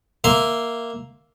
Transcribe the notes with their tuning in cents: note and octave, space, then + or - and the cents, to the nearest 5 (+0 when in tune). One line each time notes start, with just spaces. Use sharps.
A#3 +0 E5 +0 C6 +0